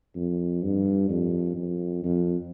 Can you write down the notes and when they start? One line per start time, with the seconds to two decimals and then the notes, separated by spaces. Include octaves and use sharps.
0.16 F2
0.63 G2
1.09 F2
1.56 F2
2.04 F2